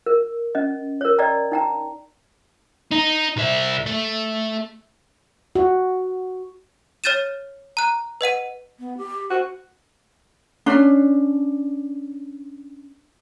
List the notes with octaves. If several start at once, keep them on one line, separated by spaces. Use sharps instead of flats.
A#4
C#4 D#5
A#4 C#5
D5 D#5 G5 A#5
D#4 G5 A#5
D#4
C2 E5
A3
F#4
C#5 F6 G6 A6 D#7 E7
A#5 F#6
B4 D#5 F#5 D#7
B3
G4
F#4 C5
C#4 D4